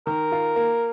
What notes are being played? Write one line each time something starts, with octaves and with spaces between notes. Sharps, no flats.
D#3 A#4
F4
A#3